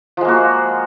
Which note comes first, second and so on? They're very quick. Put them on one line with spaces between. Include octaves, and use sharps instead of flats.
F3 G#3 A#3 F#4